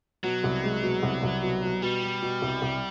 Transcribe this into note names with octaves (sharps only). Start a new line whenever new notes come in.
B2 F#3
C2
G#3
B2
C2
C2
B2
B2
B2 G3
B2
B2
C2
C2